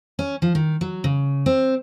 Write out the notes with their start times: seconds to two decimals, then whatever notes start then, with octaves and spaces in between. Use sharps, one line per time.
0.19 C#4
0.42 F3
0.55 D#3
0.81 F#3
1.04 C#3
1.46 C4